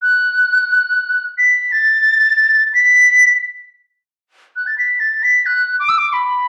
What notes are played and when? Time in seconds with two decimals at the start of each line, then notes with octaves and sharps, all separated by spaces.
0.02 F#6
1.38 B6
1.72 A6
2.74 B6
4.56 F#6
4.67 A6
4.78 B6
5.00 A6
5.23 B6
5.46 F#6
5.79 D6
5.89 E6
5.98 D6
6.13 B5